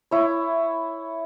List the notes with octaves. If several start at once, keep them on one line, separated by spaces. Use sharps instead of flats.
E4 C#5